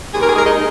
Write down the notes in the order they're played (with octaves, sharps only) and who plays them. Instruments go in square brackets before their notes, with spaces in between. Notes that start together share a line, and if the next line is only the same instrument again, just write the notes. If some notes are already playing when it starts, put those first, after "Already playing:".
[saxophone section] D#2 G#4
A#4
G#4
G#3 A#4
D#4 G#4